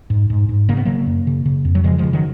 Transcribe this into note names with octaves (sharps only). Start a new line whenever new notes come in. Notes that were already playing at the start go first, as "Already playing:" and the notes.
G#2
G#2
G#2
C#3 A#3
B3
C#3 F#3 A#3
F#2
C#3
C#3
F2
F#3
C#3 F3 G#3
C#3 F3 G#3
D#3 F#3